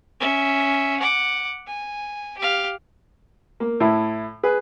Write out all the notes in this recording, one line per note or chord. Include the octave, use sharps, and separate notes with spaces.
C#4 E5
F#5 D6
G#5
G4 F5
A#3
A2 E4
G#4 B4